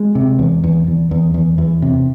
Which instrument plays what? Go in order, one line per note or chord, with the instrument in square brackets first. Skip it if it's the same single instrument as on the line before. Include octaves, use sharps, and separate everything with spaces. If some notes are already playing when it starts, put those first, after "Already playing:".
Already playing: [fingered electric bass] G#3
C3
E2
E2
E2
E2
E2
E2
C3